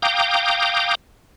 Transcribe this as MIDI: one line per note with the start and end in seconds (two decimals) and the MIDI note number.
0.02 0.95 77
0.02 0.95 79
0.02 0.95 82
0.02 0.95 86
0.02 0.95 87
0.02 0.95 91